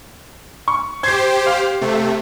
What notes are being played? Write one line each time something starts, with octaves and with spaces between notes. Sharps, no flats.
C#6
G4 C5 G#6 C7
F5
C3 A3